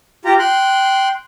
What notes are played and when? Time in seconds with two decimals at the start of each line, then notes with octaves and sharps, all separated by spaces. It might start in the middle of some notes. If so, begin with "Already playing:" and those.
0.25 F4 G4 A#5
0.39 G5 C6 F#6